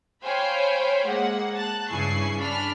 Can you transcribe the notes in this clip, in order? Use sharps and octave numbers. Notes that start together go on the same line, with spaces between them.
C5 C#5 F5 G5 G#5 B5
G#3 A#3 F#5
A5 F#6
G2 C#3 E4 G#5 C#6 C7
D4 B5 F6